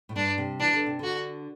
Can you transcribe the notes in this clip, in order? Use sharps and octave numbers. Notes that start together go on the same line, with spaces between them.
A2
G2 D4
C3
E3 D4
D3
C3
D3 F#4